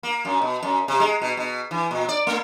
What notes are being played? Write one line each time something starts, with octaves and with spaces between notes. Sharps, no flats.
A#3
F#2
B2
F#2
C3
G#3
B2
B2
E3
A#2
D5
A3